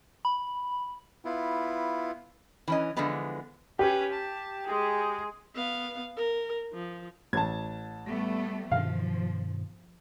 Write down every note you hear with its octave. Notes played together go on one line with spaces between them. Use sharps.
B5
B3 E4 F4
E3 C#4 D#5
D3 E3 F3 G#3 B3
C#4 G4 B4
A5
G#3 G#4
B3 F5
A#4
F3
A1 A5 G#6
G3 A3 B3
G2 B2 D#3 F3 F5